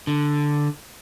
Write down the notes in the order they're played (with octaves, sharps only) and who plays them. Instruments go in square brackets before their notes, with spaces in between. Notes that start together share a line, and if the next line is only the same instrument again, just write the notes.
[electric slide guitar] D3